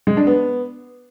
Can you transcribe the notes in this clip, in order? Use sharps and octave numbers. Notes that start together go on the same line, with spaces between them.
G#3
D4
B3